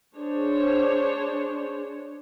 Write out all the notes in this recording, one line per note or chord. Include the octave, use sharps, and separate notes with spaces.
D4 G#4 C5 C#5